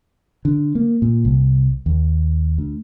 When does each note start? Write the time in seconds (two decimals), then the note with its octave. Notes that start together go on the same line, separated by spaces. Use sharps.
0.45 D3
0.75 A#3
1.02 A#2
1.25 C2
1.86 D#2
2.58 D2